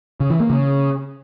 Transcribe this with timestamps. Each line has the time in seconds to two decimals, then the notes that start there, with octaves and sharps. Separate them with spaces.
0.20 C#3
0.30 E3
0.40 A#3
0.50 C#3